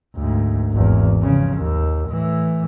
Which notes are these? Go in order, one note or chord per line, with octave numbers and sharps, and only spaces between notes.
D2 G#2
G#1 E2
C#3 F3
D#2
A2 E3